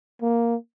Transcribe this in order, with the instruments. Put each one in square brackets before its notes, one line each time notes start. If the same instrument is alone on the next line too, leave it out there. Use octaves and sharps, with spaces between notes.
[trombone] A#3